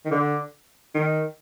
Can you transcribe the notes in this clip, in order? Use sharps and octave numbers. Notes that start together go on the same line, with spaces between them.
D#3
D3
D#3